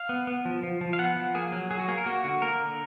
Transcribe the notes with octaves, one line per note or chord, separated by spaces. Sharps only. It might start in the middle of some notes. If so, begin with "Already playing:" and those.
Already playing: F5
B3
B3
F3
F3
F3
F5
B3 F#5
F3
A#3 G#4
F#3
F#3 G#4
F#4
A#3 G#4
A#4
A#3 F#4
D3 F#4
A#3 A#4
D3